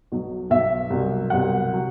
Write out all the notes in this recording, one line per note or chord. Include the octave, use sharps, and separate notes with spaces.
B1 B2 F#3
B1 B2 F#3 E5
C2 B2 F#3
C2 B2 F#3 F#5
C3 F#3